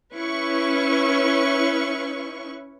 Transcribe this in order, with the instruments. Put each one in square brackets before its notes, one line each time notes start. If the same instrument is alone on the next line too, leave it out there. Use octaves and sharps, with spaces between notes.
[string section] C#4 E4 B4 C#6